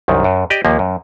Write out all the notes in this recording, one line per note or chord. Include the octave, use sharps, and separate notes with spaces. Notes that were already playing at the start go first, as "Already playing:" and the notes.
C2 F#2 D#3
F#2
G4 D5 D#5
D#2 F3 A#3
F#2